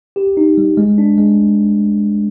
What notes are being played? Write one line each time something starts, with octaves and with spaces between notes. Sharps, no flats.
G4
D#4
G3
G#3
D4
G#3